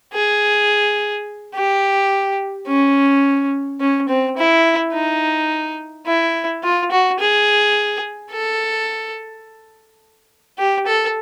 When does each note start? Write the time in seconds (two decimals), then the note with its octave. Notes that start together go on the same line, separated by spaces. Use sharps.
0.14 G#4
1.55 G4
2.67 C#4
3.80 C#4
4.09 C4
4.37 E4
4.93 D#4
6.06 E4
6.63 F4
6.91 F#4
7.20 G#4
8.32 A4
10.58 G4
10.86 A4